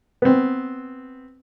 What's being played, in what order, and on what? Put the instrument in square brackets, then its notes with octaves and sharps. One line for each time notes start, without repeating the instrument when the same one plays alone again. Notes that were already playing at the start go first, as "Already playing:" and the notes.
[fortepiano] B3 C4